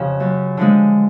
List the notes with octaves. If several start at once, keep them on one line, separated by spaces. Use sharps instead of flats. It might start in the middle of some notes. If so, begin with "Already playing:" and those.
Already playing: F2 C#3 F3 G4
F#2
D3 F3 G#3